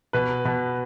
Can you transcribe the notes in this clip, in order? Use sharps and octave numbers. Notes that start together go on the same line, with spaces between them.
B2 B4
B2